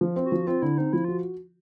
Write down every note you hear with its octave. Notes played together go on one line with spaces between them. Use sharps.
F3
C4
F#4
F3
C4 F4
D3 E4
C4 D#4
F3 E4
F4 F#4